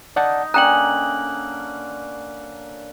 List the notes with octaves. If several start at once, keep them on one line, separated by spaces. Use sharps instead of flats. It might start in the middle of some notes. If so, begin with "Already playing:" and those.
D#4 D5 F#5 A5
D3 A#3 C#4 G5 A#5 D#6 F#6 F#7